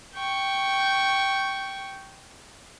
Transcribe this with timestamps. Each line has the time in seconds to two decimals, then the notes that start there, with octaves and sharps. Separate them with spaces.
0.15 G5 C#6